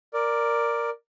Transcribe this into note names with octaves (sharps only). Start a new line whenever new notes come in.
A#4 D5